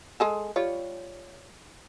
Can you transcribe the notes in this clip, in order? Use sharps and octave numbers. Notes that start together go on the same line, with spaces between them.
G#3 G#4 A4
G3 F4 C#5